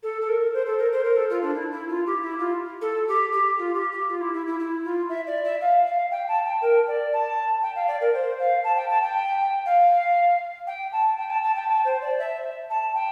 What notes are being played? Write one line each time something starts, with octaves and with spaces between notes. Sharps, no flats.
A4
A4
A#4
C5
A4
A#4
C5
A#4
A4
F4
D4
E4
E4
F4
G4
E4
F4
A4
G4
G4
F4
G4
G4
F4
E4
E4
E4
E4
F4
E5
D5
E5
F5
F5
G5
A5
G5
A#4
D5
A5
G5
F5
D5
A#4
C5
F5
A5
G5
A5
G5
F5
G5
A5
G5
A5
A5
G5
A5
C5
D5
E5
A5
G5